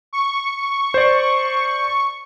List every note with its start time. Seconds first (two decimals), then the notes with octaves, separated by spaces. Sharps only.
0.13 C#6
0.94 C5 D5